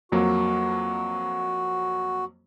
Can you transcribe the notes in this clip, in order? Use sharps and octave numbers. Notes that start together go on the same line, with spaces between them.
F2 F#3 A#3 F#4